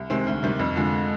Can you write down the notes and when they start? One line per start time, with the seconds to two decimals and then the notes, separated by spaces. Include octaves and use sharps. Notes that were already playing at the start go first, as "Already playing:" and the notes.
Already playing: C2
0.10 C3 D#3 G#3 C4
0.27 D2
0.43 C3 D#3 G3
0.59 F2
0.76 D3 F3 G#3